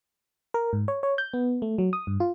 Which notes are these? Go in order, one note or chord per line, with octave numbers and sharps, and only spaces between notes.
A#4
G#2
C#5
C#5
G6
B3
A3
F#3
D#6
G2
F4